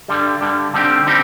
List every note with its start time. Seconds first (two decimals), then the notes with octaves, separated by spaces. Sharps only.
0.08 G2 D3 G3
0.41 G2 D3 G3
0.74 D3 G3 C4 D#4 G4
1.07 D3 G3 C4 D#4 G4